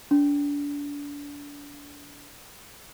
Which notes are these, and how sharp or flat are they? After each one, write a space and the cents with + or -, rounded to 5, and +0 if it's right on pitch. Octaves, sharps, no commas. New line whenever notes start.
D4 -30